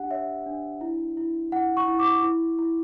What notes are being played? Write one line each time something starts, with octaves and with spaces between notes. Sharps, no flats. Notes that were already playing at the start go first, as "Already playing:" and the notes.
Already playing: D4 G4 F#5
C#5 E5
D4
E4
E4
E4 F#5
C#6
E4
D6
E4
E4